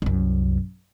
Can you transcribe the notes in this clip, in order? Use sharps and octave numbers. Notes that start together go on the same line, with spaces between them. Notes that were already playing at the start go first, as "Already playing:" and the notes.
C2 F#2